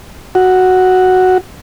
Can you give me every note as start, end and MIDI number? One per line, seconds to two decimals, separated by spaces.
0.35 1.38 66